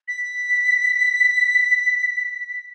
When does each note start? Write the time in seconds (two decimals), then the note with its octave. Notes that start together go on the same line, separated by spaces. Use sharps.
0.08 B6